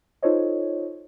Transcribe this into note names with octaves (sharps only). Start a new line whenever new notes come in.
D#4 F4 A4 C5 C#5 D#5